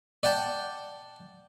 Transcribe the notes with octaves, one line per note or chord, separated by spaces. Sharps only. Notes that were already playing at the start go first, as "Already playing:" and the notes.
D5 F#5 G5 A5